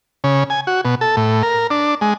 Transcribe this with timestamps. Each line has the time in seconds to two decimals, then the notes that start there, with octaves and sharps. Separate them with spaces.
0.24 C#3
0.50 G#5
0.67 F#4
0.85 B2
1.01 A4
1.17 A2
1.43 A#4
1.70 D4
2.01 G#3